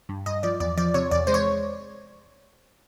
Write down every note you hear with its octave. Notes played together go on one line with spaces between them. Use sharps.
G2
G2 D#5
F3 D5
E2 D5
F3 D5
C3 C#5
E2 D5
G#3 C5
C#5